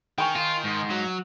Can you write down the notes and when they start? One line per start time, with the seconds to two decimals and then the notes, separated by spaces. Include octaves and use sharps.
0.18 D#3 G5 G#5 C#6
0.36 F4
0.64 G#2
0.90 F#3